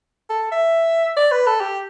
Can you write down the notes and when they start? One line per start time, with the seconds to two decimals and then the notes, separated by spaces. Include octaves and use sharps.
0.30 A4
0.52 E5
1.17 D5
1.32 B4
1.46 A4
1.61 G4